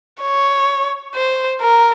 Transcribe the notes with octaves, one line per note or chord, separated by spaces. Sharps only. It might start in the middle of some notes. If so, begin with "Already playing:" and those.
C#5
C5
A#4